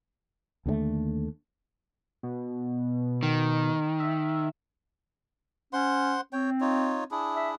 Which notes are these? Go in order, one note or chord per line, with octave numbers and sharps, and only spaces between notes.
D#2 D3 F#3 A3
B2
D#3
E5
C#4 C5 F#5 C6
C4 C#5 G5
D#4 F4 C#5
D4 E4 G#4
E5